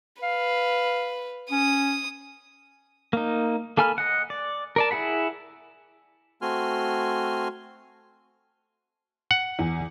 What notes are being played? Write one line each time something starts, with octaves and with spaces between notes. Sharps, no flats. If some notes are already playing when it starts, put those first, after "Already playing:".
B4 F5
C#4 D#6
A#3 D#4
A#3 A4 G#5 B5 F6
D#5 F#5
D5
A#4 D5 A5
E4 G#4 F#5 B5
A3 C4 F#4 G#5 C6 F6
F#5
E2